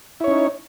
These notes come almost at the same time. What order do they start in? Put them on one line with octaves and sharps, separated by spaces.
E4 C#5 C#4 D#4